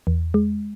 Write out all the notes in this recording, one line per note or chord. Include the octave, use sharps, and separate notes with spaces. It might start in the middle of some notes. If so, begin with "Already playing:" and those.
E2
G#3